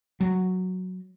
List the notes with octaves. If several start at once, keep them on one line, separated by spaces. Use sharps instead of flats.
F#3